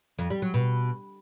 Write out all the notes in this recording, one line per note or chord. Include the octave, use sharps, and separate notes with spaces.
F2
G3
F#3
B2